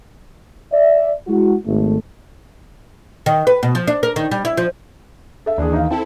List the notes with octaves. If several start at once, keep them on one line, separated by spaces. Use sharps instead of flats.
D5 E5
G#3 E4 F#4
G#1 A3
D#3
B4
B2
F3
D4
A#4
D#3
G3
E4
F3
A4 E5
D#2 E3 D4 G#4
D#4 F5
C4 E4 A4 A5